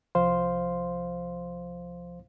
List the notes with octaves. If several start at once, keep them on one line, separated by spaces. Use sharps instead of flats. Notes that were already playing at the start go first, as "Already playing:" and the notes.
C2 F3 C5 F5 C6